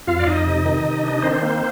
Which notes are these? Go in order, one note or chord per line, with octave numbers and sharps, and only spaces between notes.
F2 F4 F5
D5
F2 D#4 D#5
C3
D#3
C3
D4
D#3 C4 C5
A#3